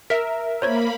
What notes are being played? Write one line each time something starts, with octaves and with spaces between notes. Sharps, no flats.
A#4 E5 B6
A#3 C5 C#5 B5 G#6